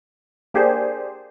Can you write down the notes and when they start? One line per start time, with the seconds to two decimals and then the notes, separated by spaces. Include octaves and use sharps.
0.54 A#3 D4 G4 G#4 C5